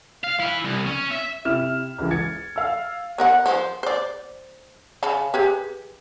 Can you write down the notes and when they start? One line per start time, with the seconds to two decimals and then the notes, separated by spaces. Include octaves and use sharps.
0.24 F5
0.40 E4 B4
0.64 C2
0.86 C#4
1.11 E5
1.45 C3 E4 F6 E7
1.98 C#2 E3
2.11 G#6 A6 C#7
2.56 F5 E6
3.18 B3 A#4 F#5
3.46 F3 C5
3.83 C5 D5
5.03 C#3 A5 B5
5.34 G4 G#4 B4